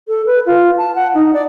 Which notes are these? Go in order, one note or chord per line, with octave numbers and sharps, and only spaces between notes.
A4
B4
F4
A5
F#5
D#4
D5